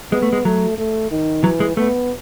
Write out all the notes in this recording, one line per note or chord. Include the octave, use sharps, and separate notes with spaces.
G#3 B3
A3
G#3
F#3 A3
A3
D#3
E3 F#3
G#3
A3 B3